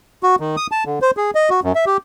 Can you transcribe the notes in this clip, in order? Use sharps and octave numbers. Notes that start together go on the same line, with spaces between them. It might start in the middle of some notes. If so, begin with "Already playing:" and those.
F#4
D#3
D#6
A5
D3
C5
G#4
D#5
F#4
F#2
E5
G4